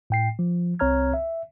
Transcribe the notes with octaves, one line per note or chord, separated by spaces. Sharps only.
A2 G5 C7
F3
C2 C4 C#5 A#5 F6 G#6
E5